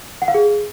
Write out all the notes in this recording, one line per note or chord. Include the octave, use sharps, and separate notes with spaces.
F#5
F5
G#4